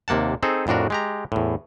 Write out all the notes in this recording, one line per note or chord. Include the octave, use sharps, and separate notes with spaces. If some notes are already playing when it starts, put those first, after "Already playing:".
D#2 C3 A#3 F#5 A5
C4 D#4 G#4 A4 C5
F2 A2 D4 F#4 A#4
G#3 G4 A#5
E2 A2